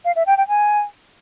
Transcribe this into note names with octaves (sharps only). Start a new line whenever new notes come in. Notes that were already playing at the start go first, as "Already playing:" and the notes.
F5
E5
G5
G5
G#5